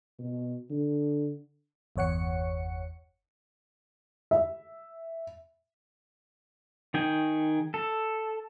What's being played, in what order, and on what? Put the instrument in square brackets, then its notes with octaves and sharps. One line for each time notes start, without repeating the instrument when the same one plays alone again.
[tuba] B2
D3
[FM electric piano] G1 E2 C#5 F#5 C#7
[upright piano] E5
[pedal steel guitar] D#3 G#4 G5
A4